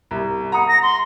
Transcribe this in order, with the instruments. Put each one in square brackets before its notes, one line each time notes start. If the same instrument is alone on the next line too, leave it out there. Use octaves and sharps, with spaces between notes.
[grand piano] C2
[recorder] F#5 [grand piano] A#5 D#6
[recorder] A#6
C6